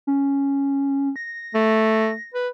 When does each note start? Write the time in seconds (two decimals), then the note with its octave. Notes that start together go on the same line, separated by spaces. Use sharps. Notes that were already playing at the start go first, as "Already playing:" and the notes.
0.07 C#4
1.16 A#6
1.54 A3
2.34 B4